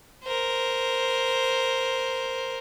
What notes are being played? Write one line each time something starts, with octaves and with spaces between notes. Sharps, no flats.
A#4 C5